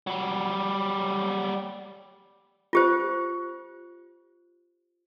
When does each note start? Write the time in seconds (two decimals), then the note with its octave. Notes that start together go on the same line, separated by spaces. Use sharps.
0.07 F#3 G3
2.73 F4 G4 C5